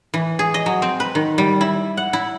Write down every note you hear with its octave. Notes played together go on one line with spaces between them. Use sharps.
E3
G#4
D#5
F#3
C4
B4
D#3
G3
E4
F#5
E4